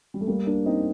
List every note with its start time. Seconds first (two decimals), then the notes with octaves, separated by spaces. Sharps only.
0.14 G3
0.21 A3
0.27 G3 A#3
0.47 A#3 D4
0.66 C4 D#4